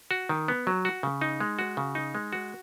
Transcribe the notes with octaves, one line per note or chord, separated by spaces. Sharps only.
F#4
D#3
B3
F#3
F#4
C#3
D#4
G#3
F#4
C#3
D#4
G#3
F#4